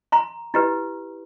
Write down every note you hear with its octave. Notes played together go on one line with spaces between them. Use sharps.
A#5 C6
E4 G4 B4